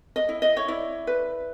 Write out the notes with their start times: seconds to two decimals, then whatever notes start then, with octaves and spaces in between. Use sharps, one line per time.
0.16 D#5
0.29 E4
0.42 D#5
0.57 C#5
0.68 E4 D5
1.07 B4